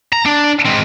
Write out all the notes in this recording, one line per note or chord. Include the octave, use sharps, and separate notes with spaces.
A#5
D4
G#3 C4